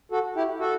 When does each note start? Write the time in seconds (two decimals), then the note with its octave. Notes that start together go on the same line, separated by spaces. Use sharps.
0.12 F#4 A4
0.36 E4 G4
0.60 F#4 A4